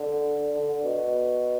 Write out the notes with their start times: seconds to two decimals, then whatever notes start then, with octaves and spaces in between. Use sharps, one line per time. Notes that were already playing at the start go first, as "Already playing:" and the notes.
Already playing: D3
0.54 D3
0.83 B2